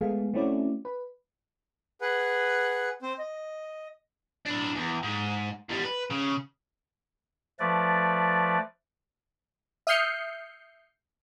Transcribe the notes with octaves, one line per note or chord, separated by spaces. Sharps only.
G#3 A3 B3 G#4 F5
A3 C4 C#4 E4 F#4 D5
B4
G#4 B4 F#5
C4 C5
D#5
D4 E4
E2
G#2
E2 G3
B4
C#3
F3 A3 B4 D5
E5 D#6 F6 G6 C7 C#7